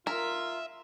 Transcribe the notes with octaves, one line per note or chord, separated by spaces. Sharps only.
F4 A#4 E5